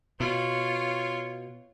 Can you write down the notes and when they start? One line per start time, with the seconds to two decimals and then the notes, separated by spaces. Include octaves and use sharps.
0.20 B2 F4 C#5